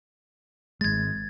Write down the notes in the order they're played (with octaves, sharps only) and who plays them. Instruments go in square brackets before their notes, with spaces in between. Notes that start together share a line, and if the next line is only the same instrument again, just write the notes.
[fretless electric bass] G#1 G#3 [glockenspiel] G#6 A6